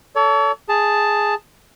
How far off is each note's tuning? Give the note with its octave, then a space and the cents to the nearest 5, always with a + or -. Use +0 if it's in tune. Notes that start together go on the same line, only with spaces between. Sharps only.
A4 +0 C#5 +40
G#4 +0 A5 +0